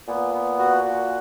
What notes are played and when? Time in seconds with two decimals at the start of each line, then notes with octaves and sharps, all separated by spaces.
0.08 A#2 B3
0.34 B3
0.59 F#4
0.84 F#4